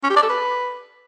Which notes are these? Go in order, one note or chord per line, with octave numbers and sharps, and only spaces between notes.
C#4
G4
D5
A4
B4